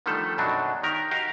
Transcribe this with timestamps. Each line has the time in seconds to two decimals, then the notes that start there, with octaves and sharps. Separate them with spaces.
0.06 D3 D#3 F3 G3 A3 A4
0.38 F#2 B2 D#3 F#3 D4
0.83 D#3 G4 A#4
1.11 F#4 G4 A#4 D#5 F5